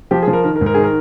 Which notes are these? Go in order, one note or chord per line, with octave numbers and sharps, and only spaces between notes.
F3 G4
G#4
F3
A#4
D#3 A#4
A#4
G#2
A#4
D#3 G#4
A#4